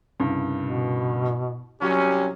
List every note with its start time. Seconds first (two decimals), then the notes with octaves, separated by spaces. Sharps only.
0.20 C2 G2 C#3
0.61 B2
1.82 C2 F#3 C#4 G4